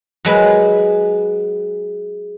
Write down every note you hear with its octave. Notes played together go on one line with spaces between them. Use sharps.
F#3 G#3 B4